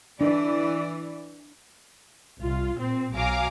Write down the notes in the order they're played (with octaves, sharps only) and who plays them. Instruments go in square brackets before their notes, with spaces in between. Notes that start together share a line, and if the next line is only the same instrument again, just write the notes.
[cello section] E3 D5 [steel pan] D4
[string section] C2 F4
A#2 C4
B1 F#3 F5 G#5 A#5 D6